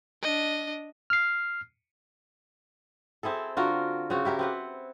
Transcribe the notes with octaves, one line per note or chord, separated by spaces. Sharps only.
D4 D#5
F6 C7
C4 E4 G#4 A4
D3 F4 F#4 A#4
C#3 C4 F#4
E4 G4 A#4 C#5
C4 B4 F#5